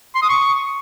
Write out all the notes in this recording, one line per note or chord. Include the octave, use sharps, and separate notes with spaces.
C6
D#6
C#6